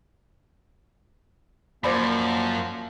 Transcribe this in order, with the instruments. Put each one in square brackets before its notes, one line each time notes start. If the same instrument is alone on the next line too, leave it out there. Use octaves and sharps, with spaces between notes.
[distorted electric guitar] F#2 [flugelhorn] F3 [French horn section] A#3 [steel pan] C5 D5 B5